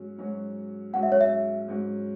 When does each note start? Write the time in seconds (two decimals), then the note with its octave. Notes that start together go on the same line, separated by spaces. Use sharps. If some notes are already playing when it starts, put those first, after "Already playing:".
Already playing: G#2 F#3 C#4 F#4
0.18 G#2 F#3 C#4 F#4
0.93 G#2 F#3 C#4 F#4 F#5
1.03 E5
1.12 C#5
1.21 E5
1.68 G#2 F#3 C#4 F#4